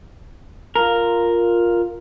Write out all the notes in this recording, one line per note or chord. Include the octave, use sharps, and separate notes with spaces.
F4 A#4